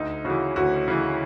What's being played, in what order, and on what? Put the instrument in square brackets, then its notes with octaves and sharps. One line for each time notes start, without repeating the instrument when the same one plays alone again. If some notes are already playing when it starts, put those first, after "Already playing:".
Already playing: [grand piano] D2 D#4
C#3 E3 F#4
D2 F#4
C#3 E3